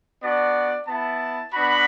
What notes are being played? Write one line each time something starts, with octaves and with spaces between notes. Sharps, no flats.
B3 D4 F#4 D5
B3 E4 A5
B3 D4 F#4 B5